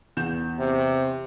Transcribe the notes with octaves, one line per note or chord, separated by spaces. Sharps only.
E2 G6 E7
C3